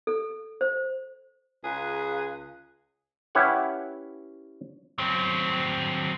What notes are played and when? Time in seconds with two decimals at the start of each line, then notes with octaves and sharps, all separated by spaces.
0.07 A4
0.61 C5
1.64 C#2 G#4 F5 A#5 F#6
3.35 C#4 E4 G4 B4 C#5 F#5
4.98 F#3 C4